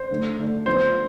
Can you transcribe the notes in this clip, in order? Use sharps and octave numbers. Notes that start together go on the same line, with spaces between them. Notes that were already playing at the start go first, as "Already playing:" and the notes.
Already playing: C5
D3 A3 D4
D3 A3 D4
D3 F3 B3 D4 C5